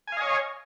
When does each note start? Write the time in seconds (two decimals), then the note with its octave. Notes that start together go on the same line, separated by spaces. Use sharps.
0.08 G#5
0.12 F5
0.17 D#5
0.22 C#5